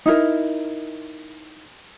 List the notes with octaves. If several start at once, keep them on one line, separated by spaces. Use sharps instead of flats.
D#4 E4 A#4